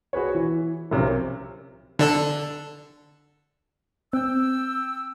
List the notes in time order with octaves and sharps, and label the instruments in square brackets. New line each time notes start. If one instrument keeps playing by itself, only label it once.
[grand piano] F#4 G#4 B4 C#5
E3
B1 C3 F3 C#4 A#4
[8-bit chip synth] D3 D4 A4
[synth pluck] C4 [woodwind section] G5 E6